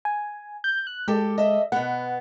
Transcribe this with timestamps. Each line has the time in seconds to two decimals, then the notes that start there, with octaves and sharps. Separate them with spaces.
0.05 G#5
0.64 G6
0.87 F#6
1.08 G#3 G4 A4
1.38 D#5 E5
1.72 B2 B3 F#5